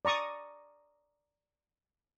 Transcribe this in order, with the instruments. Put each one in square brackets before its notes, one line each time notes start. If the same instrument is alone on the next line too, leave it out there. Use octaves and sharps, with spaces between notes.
[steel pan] D5 A#5 C#6 D#6